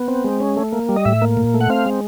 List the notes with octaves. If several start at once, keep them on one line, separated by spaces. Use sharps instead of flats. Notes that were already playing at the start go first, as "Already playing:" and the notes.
Already playing: B3
C4
G#3
C#4
A3
A#3
G3
D#5
A2 E5
A#3
A#2
A3
F#5
C4 F5
G#3